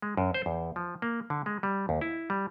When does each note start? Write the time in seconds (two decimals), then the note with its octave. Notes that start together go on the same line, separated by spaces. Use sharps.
0.02 G#3
0.17 F#2
0.34 C5
0.46 E2
0.76 F3
1.02 A#3
1.30 D3
1.46 G#3
1.63 G3
1.89 D#2
2.01 E4
2.30 G3